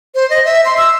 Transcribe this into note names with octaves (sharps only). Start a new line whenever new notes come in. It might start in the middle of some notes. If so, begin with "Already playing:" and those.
C5
D#5
E5
C6
E6